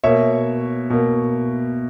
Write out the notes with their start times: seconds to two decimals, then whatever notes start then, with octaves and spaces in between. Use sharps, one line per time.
0.04 B2 A#3 C#5 E5
0.90 B2 A#3